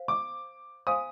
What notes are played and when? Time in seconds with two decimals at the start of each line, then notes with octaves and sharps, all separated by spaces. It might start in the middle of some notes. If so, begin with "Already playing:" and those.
Already playing: C5 F5
0.08 D6
0.87 C5 F5 G#5 C6 D#6